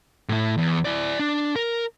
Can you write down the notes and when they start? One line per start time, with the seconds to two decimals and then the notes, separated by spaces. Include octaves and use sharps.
0.29 A2 E4
0.58 E2
0.85 E4 D5
1.19 D4
1.56 A#4